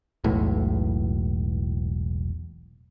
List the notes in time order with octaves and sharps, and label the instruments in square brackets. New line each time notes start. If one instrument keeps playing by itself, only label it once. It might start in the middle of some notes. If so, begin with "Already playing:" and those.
[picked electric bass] E1 B1 A2